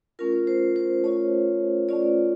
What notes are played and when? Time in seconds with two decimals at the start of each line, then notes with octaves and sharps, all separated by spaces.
0.19 A3 C#4 F4 A#4
0.47 C5
0.76 C5
1.04 A3 C#4 F4 C#5
1.89 A3 C#4 F4 D5